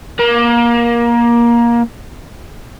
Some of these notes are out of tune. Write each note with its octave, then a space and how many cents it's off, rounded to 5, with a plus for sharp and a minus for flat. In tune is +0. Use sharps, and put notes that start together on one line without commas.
A#3 +20